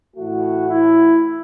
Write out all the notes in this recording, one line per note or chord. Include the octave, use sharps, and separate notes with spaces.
A2 E3 A3 F#4
E4